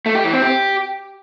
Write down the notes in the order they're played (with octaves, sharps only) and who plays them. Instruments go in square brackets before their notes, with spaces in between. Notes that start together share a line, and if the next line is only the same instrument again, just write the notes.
[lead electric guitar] A3
G4
E3
C4
G4